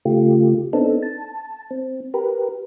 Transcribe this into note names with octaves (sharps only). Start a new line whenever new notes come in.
C#3 A3 F4 G4
B3 C4 D4 D#4 A4
A5
C4
G4 A#4 B4